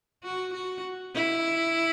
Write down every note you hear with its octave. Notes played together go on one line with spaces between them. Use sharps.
F#4
F#4
E4